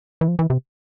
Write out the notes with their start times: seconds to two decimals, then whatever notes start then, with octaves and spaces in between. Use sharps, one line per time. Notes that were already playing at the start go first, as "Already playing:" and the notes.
0.21 E3
0.28 F3
0.39 E3
0.50 C3